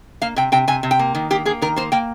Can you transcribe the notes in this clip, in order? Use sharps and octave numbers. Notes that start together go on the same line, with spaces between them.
A#3 F5
C3 G5
C3 G5
C3 G#5
C3
G5
A#3
D#3
A#3 G4
A#3 G#4
D#3 A#4
A#3 C5
A#3 G5